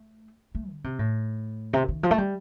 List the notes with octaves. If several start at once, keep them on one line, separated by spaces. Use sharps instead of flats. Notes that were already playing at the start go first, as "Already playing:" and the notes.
Already playing: A3
A3
D3
C3
A2
C3
D#3
F3
A3
G3